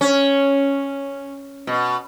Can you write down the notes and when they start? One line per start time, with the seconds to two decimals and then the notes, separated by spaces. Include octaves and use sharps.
0.01 C#4
1.67 B2